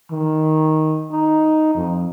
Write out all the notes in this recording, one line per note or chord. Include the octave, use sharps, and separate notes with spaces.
D#3
D#4
F2